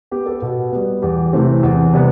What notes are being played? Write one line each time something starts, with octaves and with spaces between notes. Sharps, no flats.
B3 G4
A4
B2 B4
G3 B3
E2 G4
C3 E3 A3 C4
E2
C3 G3 B3